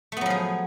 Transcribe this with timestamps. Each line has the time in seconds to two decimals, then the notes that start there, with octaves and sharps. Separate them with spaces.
0.12 A3
0.17 B3
0.21 F#3
0.26 F3
0.30 G#4